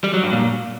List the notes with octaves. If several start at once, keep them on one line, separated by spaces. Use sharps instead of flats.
G3
F#3
G2
A#2